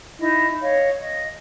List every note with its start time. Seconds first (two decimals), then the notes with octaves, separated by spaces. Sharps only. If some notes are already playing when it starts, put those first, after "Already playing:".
0.18 D#4 E4 D#5
0.60 C#5 D#5 F5
1.00 D#5